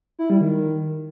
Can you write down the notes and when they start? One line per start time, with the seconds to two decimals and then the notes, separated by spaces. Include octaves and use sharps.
0.19 E4
0.30 G3
0.41 D#3